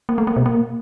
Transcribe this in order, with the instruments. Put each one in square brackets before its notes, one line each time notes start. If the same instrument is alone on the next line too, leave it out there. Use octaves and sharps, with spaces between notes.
[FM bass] A#3
A3
A#3
B2
A#3